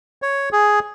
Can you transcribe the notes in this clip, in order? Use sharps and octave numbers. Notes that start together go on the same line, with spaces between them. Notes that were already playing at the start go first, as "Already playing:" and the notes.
C#5
G#4